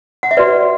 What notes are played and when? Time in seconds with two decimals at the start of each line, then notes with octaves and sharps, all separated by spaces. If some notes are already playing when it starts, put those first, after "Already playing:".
0.23 F#5
0.31 E5
0.37 F#4 B4 D5